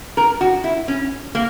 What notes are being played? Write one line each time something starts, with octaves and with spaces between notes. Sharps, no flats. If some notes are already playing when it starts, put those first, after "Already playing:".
A#4
F#4
E4
C#4
A#3